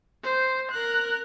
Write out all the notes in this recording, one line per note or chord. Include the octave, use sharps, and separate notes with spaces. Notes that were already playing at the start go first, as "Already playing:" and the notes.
C5
A#4 F#6